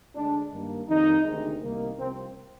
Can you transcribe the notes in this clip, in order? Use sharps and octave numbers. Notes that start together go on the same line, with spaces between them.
D2 D3 G#3 D4
G2 D#3 A#3
F2 D#3 G3 A#3 D#4
D2 C3 D#3 G#3
C2 C3 D#3 A#3
C2 C3 F3 C4